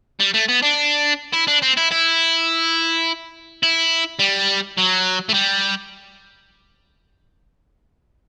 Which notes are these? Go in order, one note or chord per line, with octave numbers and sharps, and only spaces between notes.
G3
A3
B3
D4
E4
D4
C4
E4
E4
E4
G3
F#3
A3
G3